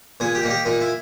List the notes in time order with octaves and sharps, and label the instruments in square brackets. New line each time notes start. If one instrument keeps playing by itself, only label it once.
[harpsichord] A#2 G#4
G4
A#3 D#4
G4
A#2 D#4
E4